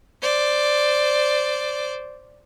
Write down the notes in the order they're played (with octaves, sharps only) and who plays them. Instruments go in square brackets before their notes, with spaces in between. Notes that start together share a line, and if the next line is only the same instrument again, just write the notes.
[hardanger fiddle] C5 D5